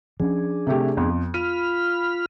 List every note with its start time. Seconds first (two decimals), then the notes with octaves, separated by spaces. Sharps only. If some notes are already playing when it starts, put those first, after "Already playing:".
0.20 F3 C#4 D4 G#4
0.67 C3 A3 G4
0.97 F2 B3
1.34 F4 B5 F6 D#7